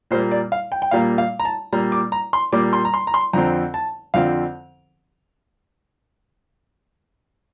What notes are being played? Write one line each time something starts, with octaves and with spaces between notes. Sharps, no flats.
A#2 G3 A#3 C5
D5
F5
G5
G5
A#2 G3 A#3 F5
F5
A#5
A5
A#2 G3 A#3 A#5
D6
A#5
C6
A#2 G3 A#3 D6
C6
A#5
C6
A#5
C6
F2 D3 F3 C4 A#5
A5
F2 D3 F3 C4 F5